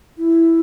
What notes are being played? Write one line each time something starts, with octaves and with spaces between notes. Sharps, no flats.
E4